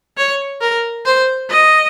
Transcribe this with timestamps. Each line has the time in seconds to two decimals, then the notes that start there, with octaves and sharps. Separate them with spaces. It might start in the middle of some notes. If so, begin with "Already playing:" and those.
0.17 C#5
0.61 A#4
1.06 C5
1.50 D#5